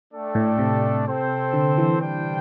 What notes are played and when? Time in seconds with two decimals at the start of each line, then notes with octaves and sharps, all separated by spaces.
0.12 A3 D4 A4 D5 G5
0.35 A2
0.59 C3
1.06 C4 A4 C5 G5
1.53 D3
1.78 E3
2.01 G3 D4 C5 G5